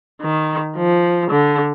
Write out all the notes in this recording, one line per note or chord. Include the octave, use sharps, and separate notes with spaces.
D#3
F3
D3